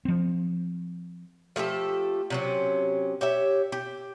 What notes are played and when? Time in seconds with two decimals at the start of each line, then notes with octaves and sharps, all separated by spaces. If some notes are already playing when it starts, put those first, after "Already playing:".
0.05 F3 C4
1.56 F3 A3 G4 A4
2.30 C3 F#3 C#4
3.21 G4 C#5 E5
3.72 G4